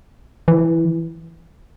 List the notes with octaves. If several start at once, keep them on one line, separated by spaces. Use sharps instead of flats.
E3